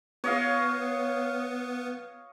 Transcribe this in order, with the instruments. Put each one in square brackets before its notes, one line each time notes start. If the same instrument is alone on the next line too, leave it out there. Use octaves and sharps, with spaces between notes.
[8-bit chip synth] B3 [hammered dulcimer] C#5 D#5 F5